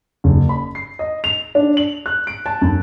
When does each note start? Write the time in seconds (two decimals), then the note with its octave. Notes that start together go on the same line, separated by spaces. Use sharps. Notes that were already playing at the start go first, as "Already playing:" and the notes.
0.24 F#1
0.49 B5
0.75 C7
0.99 D#5
1.24 F7
1.55 D4
1.77 F#7
2.06 F#6
2.27 D7
2.46 A5
2.62 F#2